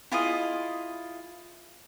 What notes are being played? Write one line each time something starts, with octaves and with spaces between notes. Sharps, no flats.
E4 F4 G#4 D#5